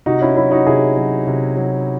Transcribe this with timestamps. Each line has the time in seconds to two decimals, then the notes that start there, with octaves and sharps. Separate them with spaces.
0.06 C3 D#4 F#4
0.21 C#4 E4
0.36 F#3 C#4 E4
0.51 D#4 F#4
0.66 C3 E4 G#4
0.97 F#3
1.27 C3
1.57 F#3